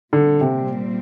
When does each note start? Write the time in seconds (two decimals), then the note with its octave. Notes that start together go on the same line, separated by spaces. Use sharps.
0.12 A#2 D3 G3 C4
0.41 C3